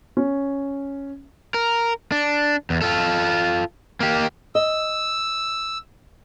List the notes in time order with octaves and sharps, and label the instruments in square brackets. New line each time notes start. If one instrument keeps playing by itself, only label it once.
[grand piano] C#4
[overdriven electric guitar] A#4
D4
E2
F4 A4
A#3 G4
[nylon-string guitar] D#5 [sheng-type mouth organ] E6